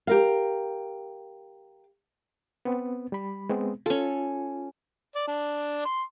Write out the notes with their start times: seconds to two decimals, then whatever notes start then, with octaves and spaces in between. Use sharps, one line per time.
0.07 G4 A#4 F5
2.65 B3 C4
3.12 G3 B5
3.49 G#3 B3 C4
3.86 C#4 F4 A4
5.15 D5
5.28 D4
5.86 C6